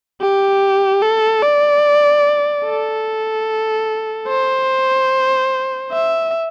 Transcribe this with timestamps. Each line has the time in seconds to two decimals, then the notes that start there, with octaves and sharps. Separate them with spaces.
0.21 G4
1.02 A4
1.43 D5
2.65 A4
4.29 C5
5.92 E5